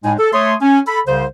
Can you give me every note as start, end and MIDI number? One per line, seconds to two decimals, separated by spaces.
0.04 0.13 45
0.04 0.13 56
0.04 0.13 63
0.04 0.13 80
0.18 0.32 69
0.33 0.55 57
0.33 0.55 73
0.33 0.55 84
0.33 0.55 87
0.61 0.80 61
0.61 0.80 80
0.87 1.00 69
0.87 1.00 83
1.07 1.25 36
1.07 1.25 49
1.07 1.25 72